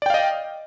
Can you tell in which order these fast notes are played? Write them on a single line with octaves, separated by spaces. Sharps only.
D5 G5 F5 D#5